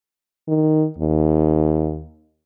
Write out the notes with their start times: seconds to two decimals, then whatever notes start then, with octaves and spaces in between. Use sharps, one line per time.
0.48 D#3
0.98 D#2